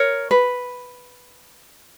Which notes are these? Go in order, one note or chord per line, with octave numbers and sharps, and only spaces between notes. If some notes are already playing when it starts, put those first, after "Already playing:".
Already playing: A#4 C#5
B4